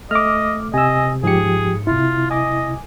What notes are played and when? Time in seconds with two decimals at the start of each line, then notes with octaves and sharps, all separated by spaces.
0.11 A3 D#5 D6 F6
0.74 C3 D#5 G#5 E6
1.23 G#2 F3 G4 G#4 C#7
1.87 C3 E4 F4
2.31 D#5 G#5 D6